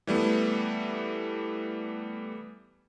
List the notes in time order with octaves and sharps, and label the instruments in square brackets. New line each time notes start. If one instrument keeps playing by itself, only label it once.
[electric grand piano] E3 G3 A3 B3